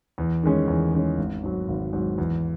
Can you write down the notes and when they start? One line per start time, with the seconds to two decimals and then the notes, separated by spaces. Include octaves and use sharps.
0.18 E2
0.43 D#3 G#3 C#4
0.68 E2
0.93 D#3 G#3 C#4
1.18 G#1
1.43 G#2 F#3
1.68 G#1
1.93 G#2 F#3
2.18 E2